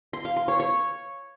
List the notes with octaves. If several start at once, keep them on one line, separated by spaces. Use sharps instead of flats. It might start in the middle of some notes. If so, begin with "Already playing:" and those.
C6
F5
C6
C#5
C#5